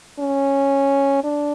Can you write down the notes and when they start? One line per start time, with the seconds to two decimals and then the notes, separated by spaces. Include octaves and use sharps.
0.20 C#4
1.24 D4